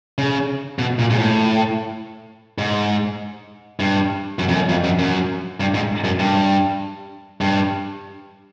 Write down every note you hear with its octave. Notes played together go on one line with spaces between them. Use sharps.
C#3
B2
A#2
G#2
A2
G#2
G2
F#2
F2
F#2
F2
F#2
F#2
G2
G#2
F#2
G2
G2